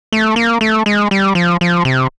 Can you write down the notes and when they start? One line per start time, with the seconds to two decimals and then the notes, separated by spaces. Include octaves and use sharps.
0.12 A3
0.36 A#3
0.61 A3
0.86 G#3
1.11 G3
1.35 F3
1.61 F3
1.85 C3